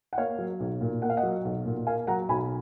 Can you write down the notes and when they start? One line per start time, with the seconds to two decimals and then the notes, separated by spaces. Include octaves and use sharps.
0.13 F#5
0.18 A#3 C#5 F5
0.39 F#3
0.60 B1
0.81 A#2
1.02 A#3 F#5
1.10 F5
1.17 D#5 F#5
1.23 F#3
1.45 B1
1.66 A#2
1.87 A#3 F5 G#5
2.07 F#3 F#5 A#5
2.29 B1 G#5 B5